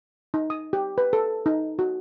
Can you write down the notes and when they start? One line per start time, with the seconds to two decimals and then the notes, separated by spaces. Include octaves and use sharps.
0.34 D#4
0.50 D#6
0.73 G4
0.98 B4
1.13 A4
1.46 D#4
1.79 F#4